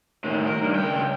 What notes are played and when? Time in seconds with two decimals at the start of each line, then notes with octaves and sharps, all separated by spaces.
0.24 A2 D#3
0.47 A#4
0.63 G2
0.75 C#2 G5